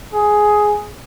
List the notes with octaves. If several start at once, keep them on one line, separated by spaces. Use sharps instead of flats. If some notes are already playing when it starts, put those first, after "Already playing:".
G#4